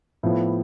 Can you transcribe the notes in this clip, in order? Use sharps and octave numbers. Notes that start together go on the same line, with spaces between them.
A2 F3 B3